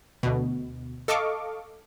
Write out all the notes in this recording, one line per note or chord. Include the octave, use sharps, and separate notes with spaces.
D2 B2
A4 D#5 F5 C#6 D6